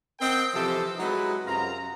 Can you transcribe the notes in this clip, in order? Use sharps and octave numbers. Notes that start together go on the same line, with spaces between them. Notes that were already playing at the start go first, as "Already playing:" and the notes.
C4 A#4 D#5 F#5 G5
C3 E3 F3 G4 A4 C5
F#3 G#3 D#4 E4 B4
F#2 C3 F4 A#5